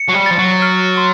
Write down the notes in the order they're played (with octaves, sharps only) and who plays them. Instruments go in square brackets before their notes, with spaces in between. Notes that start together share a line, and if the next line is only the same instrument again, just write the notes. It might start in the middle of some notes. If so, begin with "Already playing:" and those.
Already playing: [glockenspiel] C#7
[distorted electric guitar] F#3
G3
[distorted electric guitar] F3 [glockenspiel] A6
[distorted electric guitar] F#3
[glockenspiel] F6
C6